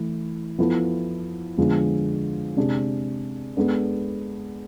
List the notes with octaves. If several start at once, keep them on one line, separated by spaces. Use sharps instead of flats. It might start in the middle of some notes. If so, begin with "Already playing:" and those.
Already playing: E3 A3 E4
F3 B3 E4 A4
D3 F3 G#3 B3
C3 G#3 D4 G#4
G#3 B3 D4 A4